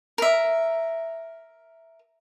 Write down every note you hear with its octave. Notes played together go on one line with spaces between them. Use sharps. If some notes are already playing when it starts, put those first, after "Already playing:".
A#4 E5